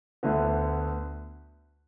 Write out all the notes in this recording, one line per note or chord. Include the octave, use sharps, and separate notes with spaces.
D2 D3 B3